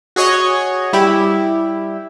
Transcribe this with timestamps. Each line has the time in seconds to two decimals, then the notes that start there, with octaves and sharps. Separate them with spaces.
0.16 F#4 G#4 C#5 D#5 C#6
0.93 G3 E4 G4